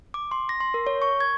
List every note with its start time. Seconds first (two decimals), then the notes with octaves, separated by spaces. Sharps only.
0.14 D6
0.31 C6
0.49 A#6
0.60 C6
0.74 A#4
0.87 C#5
1.02 C#6
1.20 G#6